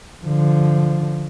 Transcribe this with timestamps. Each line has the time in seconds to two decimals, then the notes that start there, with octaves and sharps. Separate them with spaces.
0.24 D3 F3